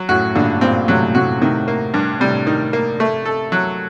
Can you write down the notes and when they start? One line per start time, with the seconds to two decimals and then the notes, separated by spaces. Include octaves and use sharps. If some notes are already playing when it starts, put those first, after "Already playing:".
Already playing: F#3
0.09 F#2 A2 F#4
0.35 G2 A#2 D3
0.61 G2 A#2 C4
0.88 A2 C3 F#3
1.15 A2 C3 F#4
1.41 A2 C3 D#3
1.68 A#3
1.94 G2
2.20 A2 C3 G3
2.47 D#3
2.73 A#3
3.00 A3
3.25 A4
3.52 F#3